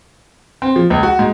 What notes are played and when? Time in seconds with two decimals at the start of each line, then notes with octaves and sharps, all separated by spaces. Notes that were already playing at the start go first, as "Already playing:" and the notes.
0.62 C4
0.76 F3
0.90 C#2
1.03 F#4
1.19 G#2